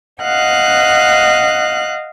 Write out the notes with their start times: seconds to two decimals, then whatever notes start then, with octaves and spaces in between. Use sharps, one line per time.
0.22 D#5 F5 F#5 F#6